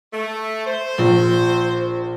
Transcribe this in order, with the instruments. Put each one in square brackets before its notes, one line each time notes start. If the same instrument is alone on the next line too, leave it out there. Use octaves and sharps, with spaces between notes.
[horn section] A3
C5
[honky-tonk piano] A#1